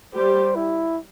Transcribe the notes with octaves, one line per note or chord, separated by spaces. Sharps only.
G3 G4 C5
E4